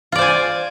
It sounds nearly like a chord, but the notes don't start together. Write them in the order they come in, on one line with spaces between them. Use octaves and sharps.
F4 D5 C5 G#5